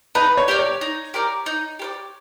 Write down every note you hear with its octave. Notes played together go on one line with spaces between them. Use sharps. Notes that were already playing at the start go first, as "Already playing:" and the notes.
D#4 B4
C#5
G4 A#4 D5
C#5
D#4
G4 A#4 D5
D#4
G4 A#4 D5